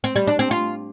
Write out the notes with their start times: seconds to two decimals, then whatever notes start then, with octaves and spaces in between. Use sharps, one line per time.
0.04 C4
0.16 G3
0.27 D4
0.39 C4
0.51 F4